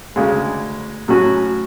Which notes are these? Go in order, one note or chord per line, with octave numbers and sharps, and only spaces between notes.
D2 C#3 G#3
A2 F#3 C#4 F#4